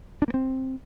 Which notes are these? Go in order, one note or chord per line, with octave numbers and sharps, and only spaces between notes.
D4
A#3
C4